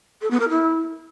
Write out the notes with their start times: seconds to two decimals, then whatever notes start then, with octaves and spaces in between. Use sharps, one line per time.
0.21 A4
0.30 B3
0.39 A#4
0.49 E4